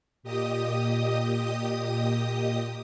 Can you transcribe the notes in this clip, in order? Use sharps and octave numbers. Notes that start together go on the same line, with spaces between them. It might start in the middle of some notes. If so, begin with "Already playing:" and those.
A#2 G4 D#5 D#6